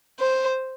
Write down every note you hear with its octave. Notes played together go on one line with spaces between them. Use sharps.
C5